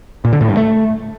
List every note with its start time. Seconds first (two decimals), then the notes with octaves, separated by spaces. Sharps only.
0.25 A#2
0.33 D3
0.41 A2
0.49 G2
0.57 A3